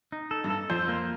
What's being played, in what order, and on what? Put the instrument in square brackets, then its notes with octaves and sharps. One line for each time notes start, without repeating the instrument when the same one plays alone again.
[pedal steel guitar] D#4
A4
[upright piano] G2
[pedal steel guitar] A4
[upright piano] F2 [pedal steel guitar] C5
[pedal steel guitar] A#3